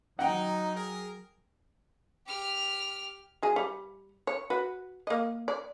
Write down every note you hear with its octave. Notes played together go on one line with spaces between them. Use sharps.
F#3 D#4 F#5 G5
G#4 A#4
G4 F6
F#3 G#4
G3
C#5
F#4 B4
A#3 D#5
D5